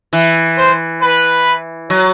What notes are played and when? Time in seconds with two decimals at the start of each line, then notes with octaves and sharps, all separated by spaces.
0.13 E3
0.57 C5
1.01 B4
1.90 F#3